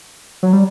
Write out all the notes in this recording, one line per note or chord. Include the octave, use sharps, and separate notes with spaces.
F#3
G3